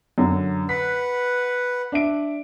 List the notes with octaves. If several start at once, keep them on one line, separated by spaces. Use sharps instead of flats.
F#2 D3
B4 F#5 B6
D4 E5 D7